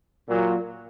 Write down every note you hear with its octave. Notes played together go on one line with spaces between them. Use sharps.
A#2 F#3